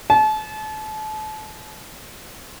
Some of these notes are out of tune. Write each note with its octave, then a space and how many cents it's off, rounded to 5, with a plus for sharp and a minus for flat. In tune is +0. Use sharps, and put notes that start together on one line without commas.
A5 -35